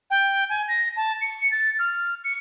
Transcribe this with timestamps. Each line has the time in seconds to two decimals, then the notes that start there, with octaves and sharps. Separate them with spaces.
0.11 G5
0.50 G#5
0.68 A#6
0.96 A5
1.21 C#7
1.52 A6
1.79 F6
2.24 C#7